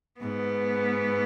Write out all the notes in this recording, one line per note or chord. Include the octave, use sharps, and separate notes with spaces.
G#2 B3